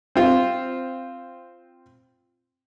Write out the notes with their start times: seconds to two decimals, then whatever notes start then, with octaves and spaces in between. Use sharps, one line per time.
0.16 C4 F4